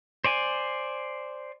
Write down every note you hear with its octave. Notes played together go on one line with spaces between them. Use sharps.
C5 D5 G#5